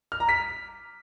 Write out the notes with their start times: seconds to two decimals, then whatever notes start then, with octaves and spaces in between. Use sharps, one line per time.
0.12 F6
0.20 A#5
0.29 B6